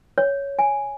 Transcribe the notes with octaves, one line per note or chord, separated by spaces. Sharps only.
C#5
G#5